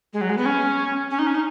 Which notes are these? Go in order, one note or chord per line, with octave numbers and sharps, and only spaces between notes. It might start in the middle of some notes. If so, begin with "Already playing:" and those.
G#3
F#3
G#3
B3
C#4
C#4
D#4
C#4
D#4